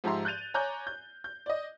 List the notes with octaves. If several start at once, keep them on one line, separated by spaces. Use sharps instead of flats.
G#2 F3 G4 E5 A#5 C6
F#6 G6 A6 D#7 F7
C#5 G#5 A#5 D6 F#6 G6
G6
G6
D5 D#5